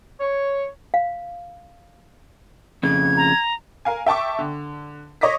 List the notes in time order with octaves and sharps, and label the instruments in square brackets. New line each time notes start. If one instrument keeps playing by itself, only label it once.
[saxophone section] C#5
[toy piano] F5
[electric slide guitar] F2 C#3 [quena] G#6
[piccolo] A#5
[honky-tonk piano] A#4 F5 G#5
E5 G5 A5 C#6 D6
D3
C#5 D#5 D6 A#6 B6